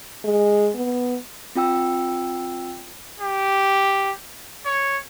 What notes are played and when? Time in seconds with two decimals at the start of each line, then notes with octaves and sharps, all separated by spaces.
0.24 G#3
0.75 B3
1.55 C4 F4 G5 E6
3.20 G4
4.66 C#5